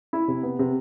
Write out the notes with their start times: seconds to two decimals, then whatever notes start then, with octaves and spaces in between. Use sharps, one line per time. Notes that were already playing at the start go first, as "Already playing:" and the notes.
0.13 E4
0.28 C3
0.43 B3
0.59 C3